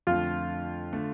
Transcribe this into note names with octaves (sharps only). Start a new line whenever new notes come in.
F2 D3 A3 F4
D3 A3